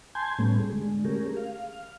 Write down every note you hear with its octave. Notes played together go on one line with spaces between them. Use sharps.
G#5 A5 C6 G6 G#6
A2 G3 A3 B3 C#4
G#4
D3 G#3
A3 C#4 G4 G#4 A#4
F5